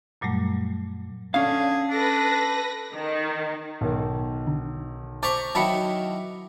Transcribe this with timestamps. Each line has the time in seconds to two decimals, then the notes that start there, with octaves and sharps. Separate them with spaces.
0.21 F#2 A#2 F#3 G3 A3
1.34 D3 C#4 G#4 F5
1.90 D4 A4 B4 A#6
2.94 D#3
3.81 B1 D#3
4.47 D3
5.23 C5 A5 A#5 C#6 D6 B6
5.55 D#3 F#3 E4 A5 B5 C#7